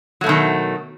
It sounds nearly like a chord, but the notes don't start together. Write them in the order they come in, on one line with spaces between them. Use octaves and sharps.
F#3 A3 B2 D#3